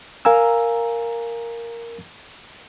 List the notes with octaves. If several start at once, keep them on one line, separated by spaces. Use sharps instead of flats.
A#4 F5 G#5 A#5 E6